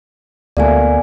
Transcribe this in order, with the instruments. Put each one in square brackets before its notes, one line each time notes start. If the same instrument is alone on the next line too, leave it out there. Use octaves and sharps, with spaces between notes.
[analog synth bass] D2 [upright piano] B2 A3 A#3 [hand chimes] D5 F5 G#5